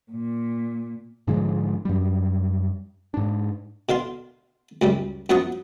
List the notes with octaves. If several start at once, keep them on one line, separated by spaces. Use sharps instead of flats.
A#2
G#2 D3 F3 G#3
F#2 G3
G#2 D4
B2 D3 F5 C6
C#2 F#2 G3
F#2 F3 F#3 F#5 C#6 D#6